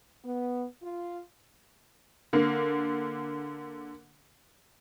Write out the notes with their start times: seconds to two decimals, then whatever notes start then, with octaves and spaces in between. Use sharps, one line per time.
0.24 B3
0.83 F4
2.33 D3 A#3